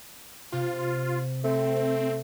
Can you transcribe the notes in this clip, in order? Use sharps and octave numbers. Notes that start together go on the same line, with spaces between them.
C3 F4
A3 C4